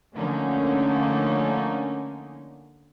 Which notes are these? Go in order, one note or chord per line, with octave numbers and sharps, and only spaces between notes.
D3 F3 A3 A#3 C#4 D#4